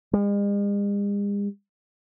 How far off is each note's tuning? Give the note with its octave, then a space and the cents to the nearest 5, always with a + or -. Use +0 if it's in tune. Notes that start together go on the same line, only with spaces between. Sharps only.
G#3 -45